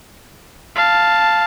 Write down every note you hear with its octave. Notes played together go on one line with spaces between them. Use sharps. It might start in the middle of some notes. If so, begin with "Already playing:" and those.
F5 A5